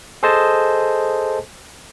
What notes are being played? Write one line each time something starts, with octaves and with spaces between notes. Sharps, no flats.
G#4 A4 C5 D#5 G#5 A5